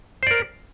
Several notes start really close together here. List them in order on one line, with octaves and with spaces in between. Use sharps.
C5 D5 A#4